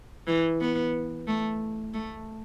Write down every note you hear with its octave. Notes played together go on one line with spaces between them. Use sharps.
E3
B3
A3
A3